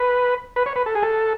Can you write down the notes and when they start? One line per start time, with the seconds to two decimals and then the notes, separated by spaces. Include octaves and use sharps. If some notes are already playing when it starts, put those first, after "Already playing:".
Already playing: B4
0.56 B4
0.66 C#5
0.76 B4
0.86 A4
0.95 G#4
1.03 A4